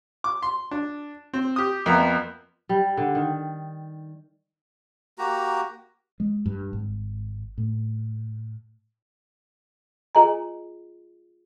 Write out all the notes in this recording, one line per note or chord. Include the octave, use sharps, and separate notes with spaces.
D6
C6
D4
C4
G4 D#6
F2 A#3 B3 E5 A#5
G3
D3
D#3
A#3 F#4 G4 A#5
G#3
G2
G#1
A2
F4 G#4 D#5 G#5 A#5